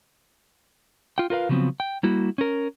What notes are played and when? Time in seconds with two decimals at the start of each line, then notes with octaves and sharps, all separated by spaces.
1.18 F4 G5
1.30 F4 A#4 B4 F5
1.49 C#3 F3 F#3 B3 C4
1.80 G5
2.03 G3 A#3 E4 F#4
2.38 C#4 A#4